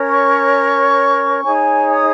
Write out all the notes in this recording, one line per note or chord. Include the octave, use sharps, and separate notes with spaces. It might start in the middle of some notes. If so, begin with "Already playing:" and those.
Already playing: C#4 A#4 C#5
C#6
D#4 G#4 C#5 G#5
D#6